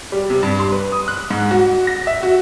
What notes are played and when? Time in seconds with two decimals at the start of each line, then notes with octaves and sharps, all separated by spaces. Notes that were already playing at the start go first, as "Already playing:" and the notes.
0.12 G3
0.30 C3
0.43 G2
0.60 C6
0.72 B4
0.92 D#6
1.08 F#6
1.30 G#2
1.51 F#4
1.87 A#6
2.07 E5
2.23 F#4